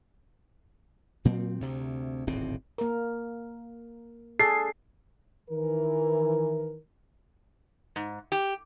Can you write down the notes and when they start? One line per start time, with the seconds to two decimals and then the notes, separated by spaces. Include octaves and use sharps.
1.25 A#2 F#3 A#3 C4
1.60 D2 C3
2.27 D1 G#1 B2 C4
2.78 A#3 A#4
4.40 D4 G#4 A4 C7
5.51 D#3 E3 A#4
7.96 G#2
8.32 G4